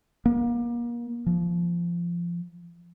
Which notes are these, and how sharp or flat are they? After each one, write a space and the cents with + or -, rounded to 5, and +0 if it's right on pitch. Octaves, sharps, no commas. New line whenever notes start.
A#3 +35
F3 -20